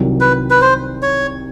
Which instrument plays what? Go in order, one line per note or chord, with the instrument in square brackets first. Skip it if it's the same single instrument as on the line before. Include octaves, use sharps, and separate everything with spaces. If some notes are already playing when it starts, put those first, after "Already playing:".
Already playing: [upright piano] C2 C3 D#3 F#3
[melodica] B4
B4
C5
C#5